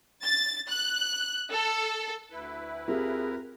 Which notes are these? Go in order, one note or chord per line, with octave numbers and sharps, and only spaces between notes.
A6
F#6
A4
D2 E4 B4
C4 F4 G4 G#4 A#4